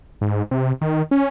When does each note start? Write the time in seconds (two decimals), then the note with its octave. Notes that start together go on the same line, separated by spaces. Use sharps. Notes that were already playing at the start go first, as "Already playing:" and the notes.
0.21 G#2
0.51 C3
0.81 D#3
1.11 C#4